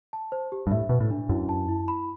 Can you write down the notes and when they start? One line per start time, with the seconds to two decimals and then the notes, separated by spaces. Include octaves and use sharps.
0.13 A5
0.32 C5
0.52 G4
0.67 G2
0.71 A2 E5
0.89 B2 B4
1.00 A2
1.11 D4
1.29 F#2 E4
1.49 A5
1.68 E4
1.88 B5